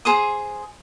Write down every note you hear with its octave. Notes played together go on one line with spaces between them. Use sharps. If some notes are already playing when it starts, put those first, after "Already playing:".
G#4 C5 D#6